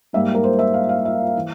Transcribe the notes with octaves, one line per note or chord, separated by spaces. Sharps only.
G#2 G3 A#3 E5
A#4
C5
E5
F5
F5
E5
E3